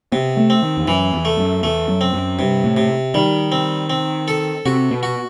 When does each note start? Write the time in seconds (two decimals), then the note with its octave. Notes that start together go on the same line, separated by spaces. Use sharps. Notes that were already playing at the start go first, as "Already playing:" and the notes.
0.12 C3 B3
0.37 A3
0.50 C4
0.63 D#3
0.77 E2
0.88 F#2 E3
1.13 E2
1.25 A3
1.38 F#2
1.63 E2 A3
1.89 F#2
2.01 C4
2.14 F#2
2.39 G2 C3
2.64 A2
2.77 C3
3.14 D#3 G3
3.52 C4
3.90 C4
4.28 A4
4.66 C3 F#4
4.91 B2
5.03 F#4